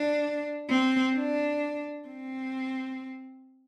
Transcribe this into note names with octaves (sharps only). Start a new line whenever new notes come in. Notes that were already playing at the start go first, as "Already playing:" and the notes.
Already playing: D4
C4
D4
C4